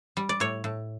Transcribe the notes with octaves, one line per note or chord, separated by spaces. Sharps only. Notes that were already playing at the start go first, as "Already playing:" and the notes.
G3
D5
A2 C#5
A2